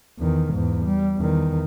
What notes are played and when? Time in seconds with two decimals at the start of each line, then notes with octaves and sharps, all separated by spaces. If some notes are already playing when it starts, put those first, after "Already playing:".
0.19 E2 D#3
0.51 E2 G#2
0.86 G3
1.17 E2 D#3